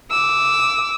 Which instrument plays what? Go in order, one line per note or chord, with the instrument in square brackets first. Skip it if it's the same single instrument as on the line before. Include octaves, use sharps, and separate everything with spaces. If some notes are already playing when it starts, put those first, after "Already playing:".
[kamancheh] D6 E6